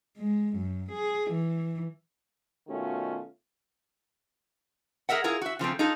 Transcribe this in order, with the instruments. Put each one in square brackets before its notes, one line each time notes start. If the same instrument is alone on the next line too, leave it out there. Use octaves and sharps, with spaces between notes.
[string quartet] G#3
F#2
G#4
E3
[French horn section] B2 D#3 A3 C#4 F4 F#4
[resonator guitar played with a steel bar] G#4 A#4 D#5 E5 F#5
E4 F4 G#4 A#4
F#4 E5
C#3 F3 A3 C4
D#4 F4 G#4 A4